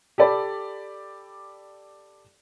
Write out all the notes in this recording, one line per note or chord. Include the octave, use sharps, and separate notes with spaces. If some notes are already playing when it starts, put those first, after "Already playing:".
G4 A4 D5 B5